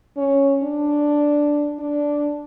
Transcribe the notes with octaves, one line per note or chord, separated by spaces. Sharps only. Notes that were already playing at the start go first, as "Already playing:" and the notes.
C#4
D4
D4